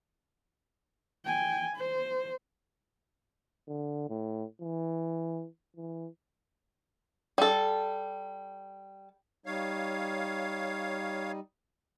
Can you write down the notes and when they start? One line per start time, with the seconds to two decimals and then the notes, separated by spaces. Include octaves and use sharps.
1.25 G5 G#5
1.76 C5
3.68 D3
4.09 A2
4.61 E3
5.76 E3
7.38 G3 A4
9.46 G3 D#4 C#5 F5